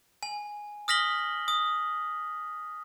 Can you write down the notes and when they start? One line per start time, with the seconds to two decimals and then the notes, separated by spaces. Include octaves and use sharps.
0.23 G#5
0.88 D#6 F6 A#6 B6 F#7 G7
1.48 D#6